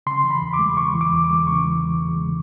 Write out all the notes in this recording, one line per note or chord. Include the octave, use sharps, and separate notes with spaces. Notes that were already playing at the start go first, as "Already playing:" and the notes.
C#3 C6
E3
B5
E2
D6
G#3
C#3 C#6
E3
D6
E2
D6
G#3
C#3 C#6
E3
E2
G#3
C#3